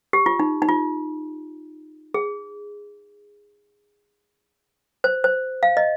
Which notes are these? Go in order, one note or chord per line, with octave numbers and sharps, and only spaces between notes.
G4
F4
D#4
D#4
F4
G#4
C5
C5
F5
D#5